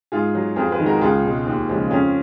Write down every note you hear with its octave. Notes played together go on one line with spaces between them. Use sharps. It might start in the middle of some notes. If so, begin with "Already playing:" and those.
G#2 F4 G#4
F#3
F2 F4 G#4
G#4 B4
D#3 G#3
F#4 A#4
C#2 F4 G#4
B2 G#3
D#2
C#3 F3 G#3
F2 C#4 F4